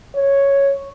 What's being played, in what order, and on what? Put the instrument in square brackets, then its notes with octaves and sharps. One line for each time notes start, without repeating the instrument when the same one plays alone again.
[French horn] C#5